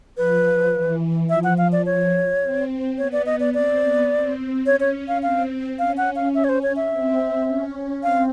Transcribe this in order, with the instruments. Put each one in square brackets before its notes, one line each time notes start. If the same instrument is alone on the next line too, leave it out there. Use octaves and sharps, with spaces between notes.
[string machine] F3 [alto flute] B4
[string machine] E3
[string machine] F3 [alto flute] E5
[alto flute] F#5
F5
D5
[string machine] F3 [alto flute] C#5
[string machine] C4
[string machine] B3 [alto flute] C#5
[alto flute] D5
D#5
D5
[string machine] C4 [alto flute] D5
[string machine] B3
C4
[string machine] C#4 [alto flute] C#5
[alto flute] C#5
F5
[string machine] C4 [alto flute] F5
[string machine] C#4 [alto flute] F5
[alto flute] F#5
F5
E5
C#5
C5
C#5
E5
[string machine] C4
C#4
[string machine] C4 [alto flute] F5